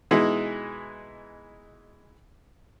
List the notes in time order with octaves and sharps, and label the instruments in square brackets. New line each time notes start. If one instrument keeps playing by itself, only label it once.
[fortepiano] B2 E3 G#3 D#4 E4